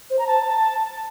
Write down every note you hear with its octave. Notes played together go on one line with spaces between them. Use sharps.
C5
A#5
A5